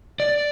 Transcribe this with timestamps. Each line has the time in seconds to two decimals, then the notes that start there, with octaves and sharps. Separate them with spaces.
0.20 D5